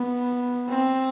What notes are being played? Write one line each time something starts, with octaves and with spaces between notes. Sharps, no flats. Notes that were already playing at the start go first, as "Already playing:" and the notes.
Already playing: B3
C4